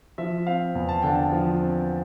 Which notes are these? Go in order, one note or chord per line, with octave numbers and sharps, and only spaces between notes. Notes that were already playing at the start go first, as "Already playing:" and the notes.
F3 E5
C4 F5
E2
A5
D3 G5
A5
F3
C4